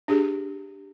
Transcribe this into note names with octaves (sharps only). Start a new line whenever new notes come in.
D4 G4 G#4